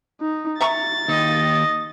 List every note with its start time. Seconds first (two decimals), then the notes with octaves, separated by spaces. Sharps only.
0.21 D#4
0.60 E5 A#5 C#6 A6
1.08 D#2 D#4 D#5